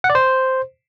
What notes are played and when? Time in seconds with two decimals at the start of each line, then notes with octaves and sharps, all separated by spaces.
0.04 F#5
0.10 D5
0.15 C5